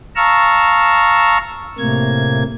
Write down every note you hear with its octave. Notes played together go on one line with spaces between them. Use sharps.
F5 A5 A#5 C#6 E6 F6
A2 C3 A#3 G#6